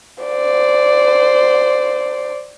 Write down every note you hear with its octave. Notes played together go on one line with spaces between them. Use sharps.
C5 D5